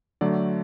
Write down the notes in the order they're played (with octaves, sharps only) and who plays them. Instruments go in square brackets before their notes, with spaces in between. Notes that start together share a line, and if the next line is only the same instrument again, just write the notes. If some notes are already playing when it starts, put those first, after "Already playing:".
[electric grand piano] D3 F#3 A3 D5